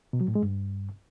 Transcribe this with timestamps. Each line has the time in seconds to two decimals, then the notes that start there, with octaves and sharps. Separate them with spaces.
0.13 B2
0.21 F#3
0.28 A2
0.35 G#3
0.43 G2